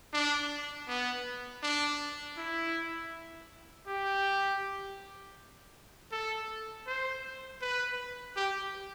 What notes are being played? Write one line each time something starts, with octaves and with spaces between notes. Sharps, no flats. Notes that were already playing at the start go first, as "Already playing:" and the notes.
D4
B3
D4
E4
G4
A4
C5
B4
G4